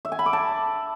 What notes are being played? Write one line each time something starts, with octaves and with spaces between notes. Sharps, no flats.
E5
G#5
B5
D6
A5